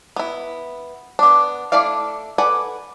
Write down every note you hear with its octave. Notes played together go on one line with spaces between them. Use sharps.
B3 E4
B3 D4
A3 D4 E4 D5 F5
A4 B4 D5 F#5 G#5